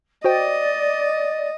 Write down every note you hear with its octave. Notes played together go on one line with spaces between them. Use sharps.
F#4 C5 D5 D#5 G5